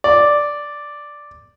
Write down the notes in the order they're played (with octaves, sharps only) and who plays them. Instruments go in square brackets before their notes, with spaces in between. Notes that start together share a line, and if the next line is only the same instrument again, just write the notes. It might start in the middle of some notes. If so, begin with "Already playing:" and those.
[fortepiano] D5